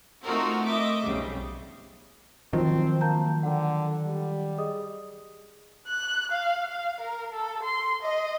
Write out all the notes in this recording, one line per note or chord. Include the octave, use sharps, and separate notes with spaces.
A3 C4 D#4 F4 F#4 A#4
D#5 E5 D6
B1 F2 C#3 G3
D#3 F3 F#3 C4
A#3 A5 A#5 G6
D3 F#5 G5
G3
G#4 D#5 D#6
F#6
F5
F5
A#4
A4
C6
D#5